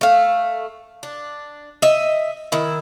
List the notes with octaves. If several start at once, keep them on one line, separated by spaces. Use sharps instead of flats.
A3 F5
D4
D#5 E5
D#3 E4